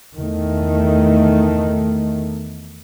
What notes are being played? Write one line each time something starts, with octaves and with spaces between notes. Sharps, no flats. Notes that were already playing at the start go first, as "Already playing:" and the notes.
E2 D#3 A3